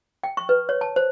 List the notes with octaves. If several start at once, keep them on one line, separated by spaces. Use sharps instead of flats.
G5
C#6
B4
C#5
A5
C5